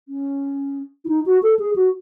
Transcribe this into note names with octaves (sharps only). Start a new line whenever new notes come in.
C#4
E4
D#4
F#4
A4
G#4
F#4